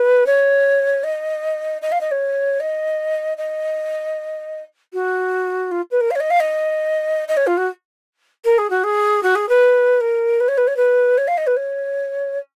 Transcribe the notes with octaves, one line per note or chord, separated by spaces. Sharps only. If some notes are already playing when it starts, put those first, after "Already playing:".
Already playing: B4
C#5
D#5
D#5
F5
D#5
C#5
D#5
D#5
F#4
F4
B4
A#4
F5
C#5
D#5
F5
D#5
D#5
C#5
F4
F#4
A#4
G#4
F#4
G#4
F#4
G#4
B4
A#4
B4
C#5
B4
C#5
B4
C#5
F5
D#5
B4
C#5